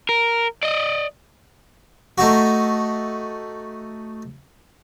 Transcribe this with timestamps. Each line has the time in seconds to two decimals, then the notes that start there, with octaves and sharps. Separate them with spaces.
0.09 A#4
0.63 D5 D#5
2.18 A3 D#4 F#4